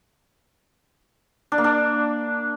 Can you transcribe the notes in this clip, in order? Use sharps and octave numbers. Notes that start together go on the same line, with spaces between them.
D4
A#3
D4